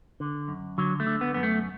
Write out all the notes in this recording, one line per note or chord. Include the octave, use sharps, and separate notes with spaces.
D3
F#2
D3 F#3
A3
D3
B3
F#2 B3
A3